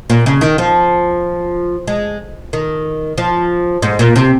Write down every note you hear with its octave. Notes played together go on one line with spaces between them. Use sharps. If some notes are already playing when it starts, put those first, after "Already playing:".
A#2
C#3
D#3
F3
G#3
D#3
F3
G#2
A#2
C3